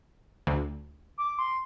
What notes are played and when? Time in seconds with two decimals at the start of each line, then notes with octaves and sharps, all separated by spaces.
0.47 D2
1.18 D6
1.39 C6